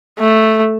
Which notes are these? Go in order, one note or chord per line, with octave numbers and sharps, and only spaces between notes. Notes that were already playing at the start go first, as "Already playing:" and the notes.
A3